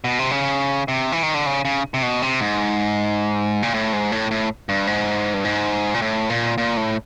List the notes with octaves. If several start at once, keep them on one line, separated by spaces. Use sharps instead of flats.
B2
C3
C#3
C3
E3
D#3
D3
C#3
C#3
C3
B2
C3
G#2
A#2
A2
G#2
A2
A2
G2
G#2
G2
G#2
A#2
A2
A#2
A#2
A2